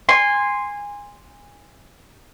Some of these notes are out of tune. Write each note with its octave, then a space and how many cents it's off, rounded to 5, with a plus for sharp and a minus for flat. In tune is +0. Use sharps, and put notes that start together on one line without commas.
G#5 -20 C6 +0